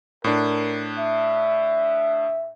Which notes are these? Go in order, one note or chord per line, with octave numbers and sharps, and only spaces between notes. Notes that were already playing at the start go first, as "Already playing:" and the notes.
A2 D4 A#4
E5